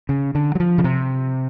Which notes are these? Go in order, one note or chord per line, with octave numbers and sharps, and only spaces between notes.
C#3
D3
F#3
F3
C#3
C3